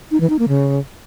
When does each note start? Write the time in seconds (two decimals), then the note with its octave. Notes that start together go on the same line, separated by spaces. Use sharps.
0.11 D#4
0.20 E3
0.30 D#4
0.39 A#3
0.48 C#3